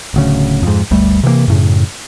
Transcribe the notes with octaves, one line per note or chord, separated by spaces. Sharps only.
D1 D2 C#3
F2 G#2
G1 D2 G3 A3
C3 E3 F3 A#3
F#2 A2 C#3